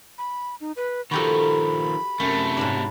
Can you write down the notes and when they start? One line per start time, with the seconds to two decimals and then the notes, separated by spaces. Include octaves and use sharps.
0.18 B5
0.60 D#4
0.76 B4
1.11 D#3 F3 F#4 G4 A4 B5
2.20 F#2 C3 A3
2.57 G#2 F#3 D4